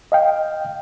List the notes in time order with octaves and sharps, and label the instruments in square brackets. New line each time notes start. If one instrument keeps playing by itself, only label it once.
[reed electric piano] D#5 F5 G5